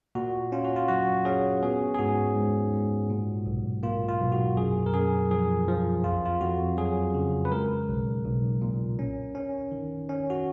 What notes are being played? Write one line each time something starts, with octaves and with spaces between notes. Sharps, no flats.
A#2 F#4
C#4 F4
F#4
F4
F#3 F#4
C#4 G#4
B3 G#4
G#4
G#2 F#4
G#2
G#2
A#2
B1
A#3 F4
F4
B1
F#4
F#2 G#4
A#4
F#2 G#4
F3 G#4
F3
F2 F4
F4
F2 F#4
F#3 G#4
C#3
B4
G#3 A#4
B1
B1
A#2
C#4
C#4
D#3
C#4
F#4